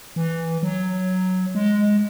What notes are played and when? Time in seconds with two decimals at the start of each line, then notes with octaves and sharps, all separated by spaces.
0.16 E3
0.63 F#3
1.55 G#3